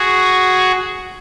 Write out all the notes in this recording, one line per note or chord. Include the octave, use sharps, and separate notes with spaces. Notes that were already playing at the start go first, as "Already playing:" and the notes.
Already playing: F#4 G#4